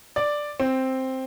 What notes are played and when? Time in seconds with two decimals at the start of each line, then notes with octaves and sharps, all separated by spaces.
0.16 D5
0.60 C4